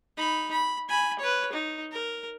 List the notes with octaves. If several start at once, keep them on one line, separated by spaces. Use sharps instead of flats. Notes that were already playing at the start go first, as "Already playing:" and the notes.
D#4 B5
B5
G#5 B5
B4 C#5
D#4
A#4